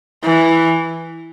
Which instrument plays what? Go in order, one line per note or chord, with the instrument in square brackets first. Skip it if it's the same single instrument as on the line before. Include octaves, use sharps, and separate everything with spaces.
[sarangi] E3